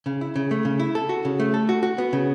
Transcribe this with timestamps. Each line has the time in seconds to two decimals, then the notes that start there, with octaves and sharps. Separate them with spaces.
0.06 C#3
0.21 E4
0.36 C#3
0.51 A3
0.65 C#3
0.79 E4
0.95 A4
1.09 F#4
1.25 C#3
1.40 A3
1.54 A4
1.69 F#4
1.83 F#4
1.98 B3
2.13 C#3